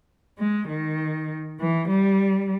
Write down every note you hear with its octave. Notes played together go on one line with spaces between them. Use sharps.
G#3
D#3
E3
G3